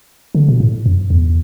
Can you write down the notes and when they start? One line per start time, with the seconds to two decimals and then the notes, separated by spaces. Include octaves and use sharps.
0.35 D3
0.48 B2
0.60 A2
0.86 F#2
1.10 E2